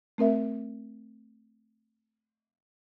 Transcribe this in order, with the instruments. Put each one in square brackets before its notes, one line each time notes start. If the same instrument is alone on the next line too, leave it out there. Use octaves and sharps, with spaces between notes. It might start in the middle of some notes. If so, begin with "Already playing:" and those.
[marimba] A3 C4 A#4 E5